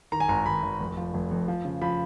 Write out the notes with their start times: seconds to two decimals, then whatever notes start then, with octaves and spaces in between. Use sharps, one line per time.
0.12 D#3 A#5
0.20 G#5
0.29 G#1 A#5
0.46 G#1 B5
0.63 G#1
0.79 F1
0.97 F3
1.14 F1
1.31 F2
1.48 F3
1.65 C#3
1.81 F3 B5